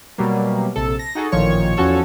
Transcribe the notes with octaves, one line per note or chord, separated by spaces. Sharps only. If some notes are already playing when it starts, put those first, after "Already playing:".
B2 F#3 G3 A#3
A#1 C3 A4
A#6
D#4 F#4 G#4 A4
A1 A#2 D#3 F3 C#5 C#6
E2 F3 C#4 F#4 A4 C#5